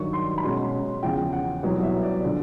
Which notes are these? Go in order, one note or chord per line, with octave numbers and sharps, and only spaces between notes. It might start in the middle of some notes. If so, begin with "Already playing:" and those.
Already playing: G2 D#3 F#3 C#6
C6
B5
B2 G#3 C#4 C6
E2 C#3 F3 G5
F#5
C2 B2 F#3 B3
E5
D5
D3 F3